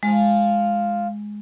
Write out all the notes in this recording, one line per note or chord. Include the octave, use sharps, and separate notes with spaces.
F3 G#3 F4